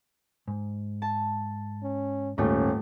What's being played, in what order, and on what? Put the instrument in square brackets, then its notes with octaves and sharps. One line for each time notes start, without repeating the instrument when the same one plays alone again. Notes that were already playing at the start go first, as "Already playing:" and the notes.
[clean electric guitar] G#2
[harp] A5
[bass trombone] C#4
[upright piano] D#1 [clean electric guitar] G#2 F4 G4 [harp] A3 [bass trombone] C#4